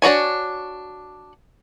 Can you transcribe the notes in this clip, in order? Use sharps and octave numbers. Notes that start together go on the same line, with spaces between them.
D4 F#4 C#5 G#5